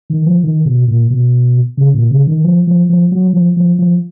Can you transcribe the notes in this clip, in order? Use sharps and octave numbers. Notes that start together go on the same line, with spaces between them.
D#3
F3
D#3
B2
A#2
B2
C#3
A#2
C#3
D#3
F3
F3
F3
F#3
F3
F3
F3